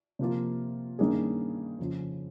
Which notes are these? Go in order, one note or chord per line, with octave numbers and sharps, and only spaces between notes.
C3 F3 A#3 F4
G2 D#3 A#3 C#4 G#4
F2 C#3 F3